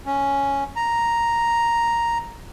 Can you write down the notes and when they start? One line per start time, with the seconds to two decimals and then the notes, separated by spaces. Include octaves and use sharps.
0.06 C#4
0.76 A#5